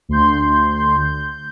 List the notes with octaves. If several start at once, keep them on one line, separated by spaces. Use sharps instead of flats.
D2 C6 G6
G6